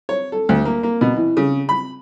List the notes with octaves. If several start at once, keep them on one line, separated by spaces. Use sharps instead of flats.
C#5
A4
D2
A#3
A#3
B2
E3
C#3
B5